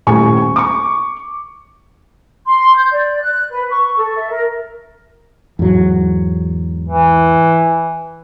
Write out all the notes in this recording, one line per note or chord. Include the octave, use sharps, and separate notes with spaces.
D#1 A2 G#5 C#6
C#6 D6
C6
G6
D5
F#6
B4
C#6
A4
E5
A#4
E2 G#2 F#3
E3